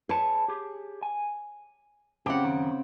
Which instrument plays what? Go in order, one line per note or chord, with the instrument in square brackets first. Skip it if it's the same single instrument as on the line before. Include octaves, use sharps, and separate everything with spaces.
[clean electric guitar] G#4 B4 A5 [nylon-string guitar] C#5
[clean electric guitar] G4 G#4
G#5
[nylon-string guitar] C#3 C4 F#5 [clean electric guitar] G4
[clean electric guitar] F#2 D#3